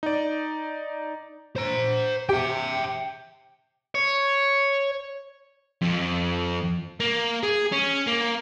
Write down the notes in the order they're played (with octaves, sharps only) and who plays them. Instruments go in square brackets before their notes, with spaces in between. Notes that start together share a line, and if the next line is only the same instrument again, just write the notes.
[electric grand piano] D#4 D5
[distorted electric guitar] C5 A#5
[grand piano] G4 [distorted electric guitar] E5 G5
[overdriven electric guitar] C#5
[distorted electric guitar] F2
A#3
G#4
C#4
A#3